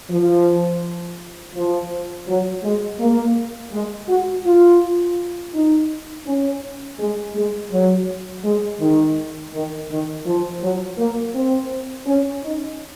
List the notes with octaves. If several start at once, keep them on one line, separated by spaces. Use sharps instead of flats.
F3
F3
F#3
G#3
A#3
G#3
F#4
F4
D#4
C#4
G#3
G#3
F#3
G#3
D#3
D#3
D#3
F3
F#3
A#3
C4
C#4
D#4